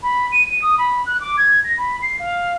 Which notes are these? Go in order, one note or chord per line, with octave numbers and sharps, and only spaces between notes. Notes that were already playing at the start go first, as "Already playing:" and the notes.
B5
D#7
D#7
D#6
B5
F#6
D6
G#6
A#6
B5
C7
F5